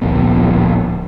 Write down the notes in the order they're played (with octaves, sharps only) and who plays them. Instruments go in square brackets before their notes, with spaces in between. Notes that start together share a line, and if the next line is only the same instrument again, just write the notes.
[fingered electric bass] D1 A#1 B3